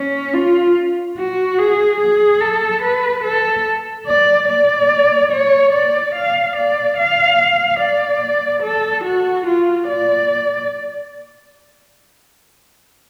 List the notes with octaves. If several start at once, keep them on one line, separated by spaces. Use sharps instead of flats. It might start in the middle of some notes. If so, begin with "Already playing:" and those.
Already playing: C#4
F4
F#4
G#4
G#4
A4
B4
A4
D5
D5
C#5
D5
F5
D5
F5
D5
A4
F#4
F4
D5